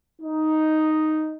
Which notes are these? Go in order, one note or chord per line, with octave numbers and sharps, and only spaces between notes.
D#4